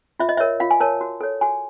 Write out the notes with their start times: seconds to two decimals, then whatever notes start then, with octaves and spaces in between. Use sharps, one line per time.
0.20 F4 E5
0.29 D#5
0.37 A#4 C#5 E5
0.60 F4 F5
0.71 G#5
0.80 A#4 C#5 A5
1.01 F#4
1.21 A4 C#5
1.41 F#4 G#5